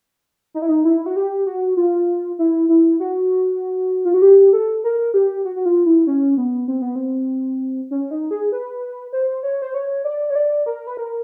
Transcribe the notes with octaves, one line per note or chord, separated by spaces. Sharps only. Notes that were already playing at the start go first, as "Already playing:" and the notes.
D#4
E4
D#4
E4
F#4
G4
F#4
F4
E4
E4
F#4
F4
F#4
G4
A4
A#4
G4
F#4
F#4
F4
E4
C#4
B3
C4
B3
C4
C#4
D#4
G#4
B4
C5
C#5
C5
C#5
D5
C#5
D5
A#4
B4
A#4